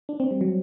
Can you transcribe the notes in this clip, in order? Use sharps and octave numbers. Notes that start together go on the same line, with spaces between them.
D4
C4
G3
F#3